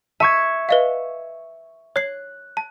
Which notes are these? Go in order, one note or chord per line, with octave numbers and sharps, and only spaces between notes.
E5 A5 C#6 G#6
B4 D#5 F5
C#5 F#6 C7
A5